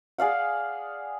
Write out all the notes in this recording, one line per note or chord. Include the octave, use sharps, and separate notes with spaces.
G#4 D5 F5 F#5